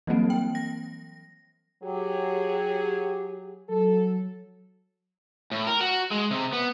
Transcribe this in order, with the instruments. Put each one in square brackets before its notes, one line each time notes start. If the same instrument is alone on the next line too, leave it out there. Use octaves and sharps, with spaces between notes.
[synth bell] E3 F#3 G3 A#3 C4
G5
A#6
[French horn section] F#3 G#4 [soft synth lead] G4
[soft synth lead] F#3 [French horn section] A4
[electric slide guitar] A2
A#4
F#4
G#3
C3
B3